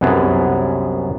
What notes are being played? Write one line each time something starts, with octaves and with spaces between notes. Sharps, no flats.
C2 F#2 B3 G#4 A5